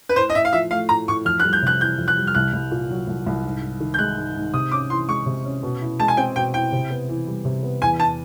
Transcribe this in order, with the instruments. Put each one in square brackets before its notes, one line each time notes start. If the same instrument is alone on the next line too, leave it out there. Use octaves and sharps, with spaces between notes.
[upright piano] B4
[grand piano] A2 [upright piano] C5
[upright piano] D#5
[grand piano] A2 [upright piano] E5
[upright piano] F5
[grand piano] F3 [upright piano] E5
[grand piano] A3 [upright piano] F5
[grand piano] A2 [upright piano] A#5
[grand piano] A2 [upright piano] C#6
[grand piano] F2 [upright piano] F6
[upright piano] F#6
[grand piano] G3
[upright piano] G6
[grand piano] C3 [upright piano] F#6
[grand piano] E3 [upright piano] G6
[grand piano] F2
[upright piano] F#6
[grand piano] G3
[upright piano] F6
[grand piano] C2 [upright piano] F#6
[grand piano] C2
A#2
F#3
C2
C2
G#2
G#2
D#3
[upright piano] G6
[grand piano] G#3 [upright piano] F#6
[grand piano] G#2
G#2
[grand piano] C3 [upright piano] D#6
[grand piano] C#4 [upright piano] D6
[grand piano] E3 [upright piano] C6
[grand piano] G#3 [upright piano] C#6
[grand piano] C3
C#4
B2
E4
[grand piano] G#3 [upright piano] A5
[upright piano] G#5
[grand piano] C4 [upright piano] G5
[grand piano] B2 [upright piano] G5
[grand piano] E4 [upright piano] G5
[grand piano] C3
B3
E3
G3
C3
B3
[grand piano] E2 [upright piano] G#5
[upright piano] A5